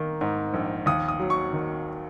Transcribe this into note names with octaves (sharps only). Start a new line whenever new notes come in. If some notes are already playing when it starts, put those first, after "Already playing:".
Already playing: D#3 A#3
G#2
A#1
D#2 D#6
D#6
F#3
C#6
D#3